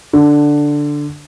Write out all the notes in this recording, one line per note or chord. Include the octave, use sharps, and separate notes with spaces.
D3